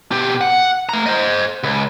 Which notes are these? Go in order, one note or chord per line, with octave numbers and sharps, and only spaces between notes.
B2 G4
F#5
A3 A#5
C5 D#5
C#2